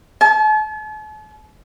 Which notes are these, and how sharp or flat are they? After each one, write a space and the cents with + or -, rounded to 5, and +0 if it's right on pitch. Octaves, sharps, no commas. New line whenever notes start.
A5 -45